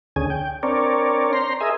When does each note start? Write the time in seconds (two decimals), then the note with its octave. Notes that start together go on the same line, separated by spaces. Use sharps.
0.16 D2 D3 C#4 G#4 G#5
0.30 G5
0.63 C4 D4 A#4 C#5 D5
1.33 C5 A#5 C6
1.61 G#4 A#4 D#5 E5 G#5